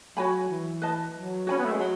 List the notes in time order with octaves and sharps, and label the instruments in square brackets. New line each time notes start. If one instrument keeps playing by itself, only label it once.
[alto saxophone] F#3 [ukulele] F#4 C#5 G#5 B5
[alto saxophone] E3
[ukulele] B4 D#5 A5
[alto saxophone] F#3
[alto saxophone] C#4 [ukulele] F#4 C#5 G#5 B5
[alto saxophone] B3
A3
G#3
F#3